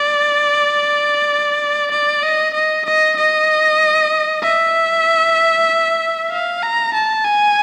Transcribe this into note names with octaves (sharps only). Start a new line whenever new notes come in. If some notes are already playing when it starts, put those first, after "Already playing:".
Already playing: D5
D5
D#5
D#5
D#5
D#5
E5
F5
A#5
A5
G#5